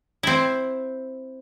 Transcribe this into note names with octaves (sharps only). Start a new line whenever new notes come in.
C4 E4